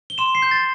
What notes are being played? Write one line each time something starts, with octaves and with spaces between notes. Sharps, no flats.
G7
C6 E7
C7
G6
A6